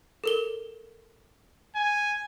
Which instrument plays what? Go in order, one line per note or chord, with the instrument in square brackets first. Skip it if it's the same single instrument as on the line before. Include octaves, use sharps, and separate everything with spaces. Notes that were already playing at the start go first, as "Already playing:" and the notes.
[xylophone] A4 A#4 G7
[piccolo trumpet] G#5